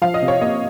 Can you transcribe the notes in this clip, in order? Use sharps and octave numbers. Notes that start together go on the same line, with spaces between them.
F3 F5
D#5
C3
C#5
A#3 D#5